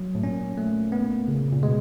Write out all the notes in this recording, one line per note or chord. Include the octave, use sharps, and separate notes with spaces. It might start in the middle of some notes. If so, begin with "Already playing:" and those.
Already playing: F#3
A2
A#2 C#4
A3
B3
C#3
A#2
B2 G#3